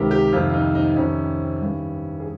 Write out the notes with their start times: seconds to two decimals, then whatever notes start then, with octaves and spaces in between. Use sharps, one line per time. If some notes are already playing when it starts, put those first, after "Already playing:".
Already playing: C#2 C3 D#3 G4 A#4
0.11 G4
0.32 F2 C3 D#3 F4
0.50 F4
0.54 D#4
0.75 D#4
0.96 F2 C3 D#3 C#4
1.61 G2 D#3
2.20 G#4